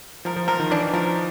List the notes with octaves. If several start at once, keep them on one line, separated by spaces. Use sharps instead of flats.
F3 A#4
F3
F3 A#4
D#3
E3 D4
F3 A#4